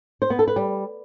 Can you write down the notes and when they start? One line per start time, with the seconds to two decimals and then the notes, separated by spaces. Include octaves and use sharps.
0.22 C5
0.30 B3
0.39 A4
0.48 B4
0.56 G3